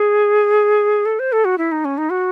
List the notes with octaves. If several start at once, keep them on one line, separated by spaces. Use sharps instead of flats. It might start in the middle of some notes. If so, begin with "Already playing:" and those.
Already playing: G#4
A4
C5
A4
F#4
E4
D#4
C#4
D#4
F#4